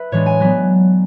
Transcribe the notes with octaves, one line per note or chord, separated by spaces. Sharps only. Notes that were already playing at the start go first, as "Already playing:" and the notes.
Already playing: B4 E5
A2 E3 G#3 D4 C#5
G#5
F#3 B3 D4